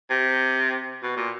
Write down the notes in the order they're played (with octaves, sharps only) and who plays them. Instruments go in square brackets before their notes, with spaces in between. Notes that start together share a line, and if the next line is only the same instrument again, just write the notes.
[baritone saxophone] C3
B2
A#2